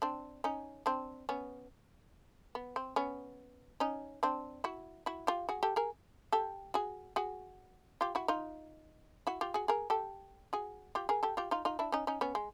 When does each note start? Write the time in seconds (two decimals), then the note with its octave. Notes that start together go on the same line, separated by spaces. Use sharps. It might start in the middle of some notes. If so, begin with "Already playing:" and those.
0.02 C4 D4
0.44 C#4 D#4
0.86 C4 D4
1.29 B3 C#4
2.55 B3
2.76 C4
2.96 B3 C#4
3.80 C#4 D#4
4.23 C4 D4
4.64 E4 F#4
5.06 E4 F#4
5.27 F4 G4
5.49 F#4 G#4
5.63 G4 A4
5.76 G#4 A#4
6.32 G4 A4
6.74 F#4 G#4
7.16 F#4 G#4
8.01 F4 G4
8.15 E4 F#4
8.28 D#4 F4
9.27 E4 F#4
9.41 F4 G4
9.54 F#4 G#4
9.68 G#4 A#4
9.90 G4 A4
10.53 F#4 G#4
10.95 F4 G4
11.09 G#4 A#4
11.23 G4 A4
11.37 F4 G4
11.51 D#4 F4
11.65 D#4 F4
11.79 D4 E4
11.92 C#4 D#4
12.07 C#4 D#4
12.21 B3 C#4
12.35 G#3